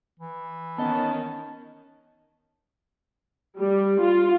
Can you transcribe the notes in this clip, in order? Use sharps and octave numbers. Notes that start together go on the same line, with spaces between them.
E3
D#3 B3 C#4 D#5 A5
G3
F4